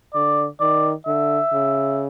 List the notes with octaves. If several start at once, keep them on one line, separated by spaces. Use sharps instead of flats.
D3 D5
D#3 D5
D3 E5
C#3